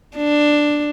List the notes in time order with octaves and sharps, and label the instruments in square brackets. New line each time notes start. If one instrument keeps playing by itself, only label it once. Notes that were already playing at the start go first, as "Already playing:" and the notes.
[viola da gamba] D4